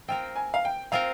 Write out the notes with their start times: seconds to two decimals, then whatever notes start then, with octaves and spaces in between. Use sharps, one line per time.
0.08 C4 F4 A#4 G5
0.36 G#5
0.54 F5
0.65 G5
0.92 C4 F4 A#4 F5